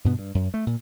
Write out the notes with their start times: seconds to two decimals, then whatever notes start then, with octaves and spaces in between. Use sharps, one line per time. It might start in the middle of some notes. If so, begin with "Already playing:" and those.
0.04 G2 B2 B3
0.19 G2
0.35 F#2
0.54 A3
0.67 A#2